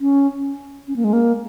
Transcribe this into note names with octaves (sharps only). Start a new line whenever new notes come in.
C#4
C#4
A#3
G#3
A#3